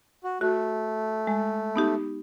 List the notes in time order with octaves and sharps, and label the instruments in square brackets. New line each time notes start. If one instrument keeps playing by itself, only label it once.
[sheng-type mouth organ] F#4
[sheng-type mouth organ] A3 [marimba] F#4
[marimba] G#3
B3 D#4 G4